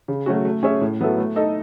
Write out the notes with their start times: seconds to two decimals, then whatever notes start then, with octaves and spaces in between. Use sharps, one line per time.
0.08 C#3
0.26 F#3 A3 C#4 F#4
0.45 A3
0.63 C#4 G#4 C#5 E5
0.81 A2
1.00 F#3 B3 E4 A4
1.18 A3
1.36 D#4 A4 D#5